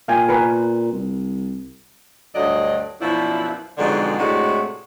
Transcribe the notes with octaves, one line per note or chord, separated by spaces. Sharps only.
A#2 F5 G5 G#5
A#4 B4 G#5
C2
D2 G2 F#3 D5 D#5
F#2 B2 F3 D4 E4
F2 G#2 B2 D3 F#3 G#3
A2 C3 G#3 D4 E4 F#4